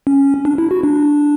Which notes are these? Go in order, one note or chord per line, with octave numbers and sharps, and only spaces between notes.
C#4
D4
E4
F#4
D4